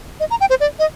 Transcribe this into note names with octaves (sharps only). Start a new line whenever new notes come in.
D#5
A#5
G5
C5
D5
D#5